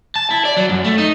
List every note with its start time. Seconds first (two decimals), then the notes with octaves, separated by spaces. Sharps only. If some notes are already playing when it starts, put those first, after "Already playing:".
0.16 A5
0.31 E4
0.45 D5
0.57 F#3
0.69 F#2
0.84 A3
0.98 D#4